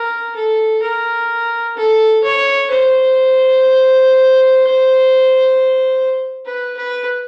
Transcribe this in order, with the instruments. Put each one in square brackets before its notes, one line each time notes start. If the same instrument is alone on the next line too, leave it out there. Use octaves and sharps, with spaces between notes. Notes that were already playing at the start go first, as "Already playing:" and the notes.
Already playing: [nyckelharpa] A#4
A4
A#4
A4
C#5
C5
B4
B4